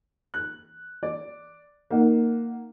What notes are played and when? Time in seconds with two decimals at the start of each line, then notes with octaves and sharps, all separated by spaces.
0.34 F#6
1.03 D5
1.91 A#3 D#4 F#5